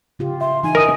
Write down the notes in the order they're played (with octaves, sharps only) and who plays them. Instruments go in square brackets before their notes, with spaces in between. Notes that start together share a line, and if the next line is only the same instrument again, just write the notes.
[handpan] C#3 F4 G4
[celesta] E5 [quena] C6
[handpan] E3 D#4 [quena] G#5
[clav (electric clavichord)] A#4 [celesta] D#5 D#6 D#7